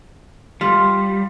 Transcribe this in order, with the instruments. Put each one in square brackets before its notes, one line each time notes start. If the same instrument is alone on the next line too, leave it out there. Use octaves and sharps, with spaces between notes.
[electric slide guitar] G3 [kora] F4